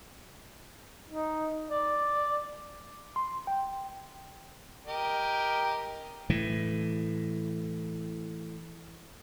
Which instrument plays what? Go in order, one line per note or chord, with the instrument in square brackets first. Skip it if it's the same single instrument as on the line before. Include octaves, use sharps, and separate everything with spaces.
[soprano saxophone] D#4
D5
[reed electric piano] C6
G5
[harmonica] G4 A#4 D#5
[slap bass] A2 E3